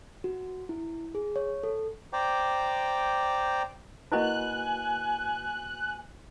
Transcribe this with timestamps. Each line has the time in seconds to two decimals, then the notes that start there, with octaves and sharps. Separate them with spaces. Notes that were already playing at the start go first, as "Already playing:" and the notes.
0.24 F#4
0.69 E4
1.15 G#4
1.36 C#5
1.63 A4
2.13 C5 D5 G5 A#5 D6
4.12 A#3 E4 F#4 B4 D#5 G#5 B5 F#6